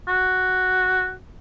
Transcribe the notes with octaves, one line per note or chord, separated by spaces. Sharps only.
F#4